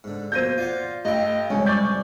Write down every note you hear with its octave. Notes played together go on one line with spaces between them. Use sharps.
G#2 D3
F2 B2 A#3 C5 G6 G#6 A#6 D#7
F4 D5 F5 F#5
G2 A3 F4 A4 D#5 G5
C2 F2 C3 G#3 C#4 G#5
D5 C#6 D6 G6